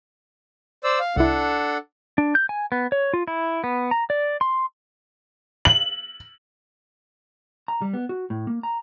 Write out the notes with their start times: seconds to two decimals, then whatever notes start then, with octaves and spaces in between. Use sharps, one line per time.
0.84 C5 D5 E6
0.99 F5
1.16 C2 D4 E4 A4 F#5
2.18 D4
2.35 G6
2.49 G#5
2.72 B3
2.92 C#5
3.14 F4
3.28 E4
3.64 B3
3.91 A#5
4.10 D5
4.41 C6
5.65 F#7
7.68 A#5
7.82 G3
7.94 B3
8.09 F#4
8.30 A2
8.47 A#3
8.63 A#5